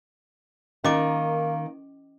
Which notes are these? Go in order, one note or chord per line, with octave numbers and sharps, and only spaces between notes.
D#3 A#3 C#4 D#5 D6